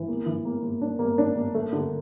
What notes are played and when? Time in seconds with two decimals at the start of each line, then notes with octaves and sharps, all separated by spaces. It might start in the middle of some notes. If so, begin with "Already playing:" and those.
Already playing: E3
0.08 A#3
0.26 E3
0.45 A#3
0.63 A#3
0.81 D4
0.99 A#3
1.18 D4
1.36 A#3
1.55 A3
1.73 D3